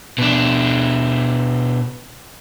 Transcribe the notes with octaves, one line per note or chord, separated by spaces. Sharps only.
B2 D4